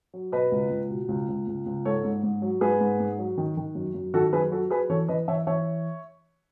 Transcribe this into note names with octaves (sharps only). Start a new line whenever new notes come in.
F#3
B2 B4 D#5
C#2
C#2
B2
C#2
C#2
C#2
C#2
G#2 A4 C#5
G#2
G#2
F#3
G#2 G#4 B4
G#2
G#2
F#3
D#3
D#3
F#2
F#2
D#3 F#4 A4
F#2 G#4 B4
F#3 F#4 A4
F#3 G#4 B4
E3 A4 C#5
E3 B4 D#5
E3 C#5 E5
E3 C#5 E5